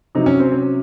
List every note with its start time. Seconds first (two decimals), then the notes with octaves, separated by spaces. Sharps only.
0.15 C3 F#3 D#4
0.26 C#4
0.40 C4
0.52 C#4